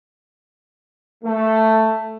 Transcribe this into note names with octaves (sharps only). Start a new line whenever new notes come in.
A3